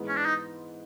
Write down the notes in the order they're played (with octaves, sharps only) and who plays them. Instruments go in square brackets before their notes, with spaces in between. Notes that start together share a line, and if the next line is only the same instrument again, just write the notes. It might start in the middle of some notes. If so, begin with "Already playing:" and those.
Already playing: [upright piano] G#2 E3 G#3 B3
[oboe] C#4
D4
D#4